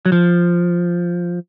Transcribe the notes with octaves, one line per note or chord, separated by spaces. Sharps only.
F#3
F3